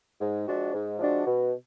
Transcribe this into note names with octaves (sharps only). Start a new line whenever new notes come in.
G#2
F3 G#3 D4 F#4
G#2
F3 G#3 D4 F#4
B2